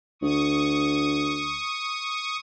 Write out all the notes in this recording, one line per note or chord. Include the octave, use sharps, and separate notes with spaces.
D2 C#6 D#6